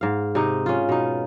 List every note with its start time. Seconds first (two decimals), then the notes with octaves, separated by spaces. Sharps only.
0.01 G#2 F5
0.35 C3 D#4
0.66 C#4 F4
0.89 B2 D#4